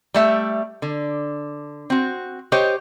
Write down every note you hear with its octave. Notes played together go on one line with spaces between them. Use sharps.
G3 A3 E5
D3
C4 F#4
G4 C5 C#5 D#5